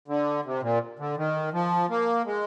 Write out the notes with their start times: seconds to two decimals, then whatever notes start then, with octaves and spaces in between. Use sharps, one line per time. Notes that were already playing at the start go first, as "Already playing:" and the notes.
0.08 D3
0.45 C3
0.62 A#2
0.99 D3
1.17 D#3
1.53 F3
1.90 A#3
2.26 G#3